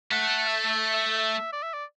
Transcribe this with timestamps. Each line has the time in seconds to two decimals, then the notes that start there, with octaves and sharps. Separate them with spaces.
0.11 A3 F#5
0.47 E5
0.70 E5
0.94 E5
1.18 E5
1.53 D5
1.63 E5
1.74 D5